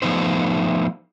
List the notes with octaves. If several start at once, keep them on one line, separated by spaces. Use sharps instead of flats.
F3 A3 B3 D#4 C5